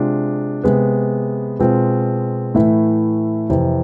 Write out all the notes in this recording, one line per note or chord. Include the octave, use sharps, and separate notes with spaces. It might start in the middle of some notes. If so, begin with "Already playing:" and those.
Already playing: C3 G#3 D4 F4
C3 G#3 B3
B2 G#3 C4 F4
A2 E3 A3 E4
F2 C3 E3